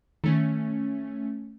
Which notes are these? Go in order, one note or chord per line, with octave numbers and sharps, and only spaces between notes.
D#3 A3 C#4